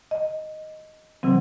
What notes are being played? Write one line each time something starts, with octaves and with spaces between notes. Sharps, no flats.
D#5
C3 E3 F#3 C4